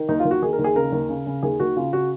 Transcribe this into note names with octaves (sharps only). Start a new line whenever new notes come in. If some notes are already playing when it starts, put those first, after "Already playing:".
Already playing: D#3
D#2 D#4
F4
D#2
F#4
D#3 G#4
A#4
D#2
G#4
C#3 A#4
D#2
C#3
C#3
D#2 G#4
D#2 F#4
C#3 F4
C#3 F#4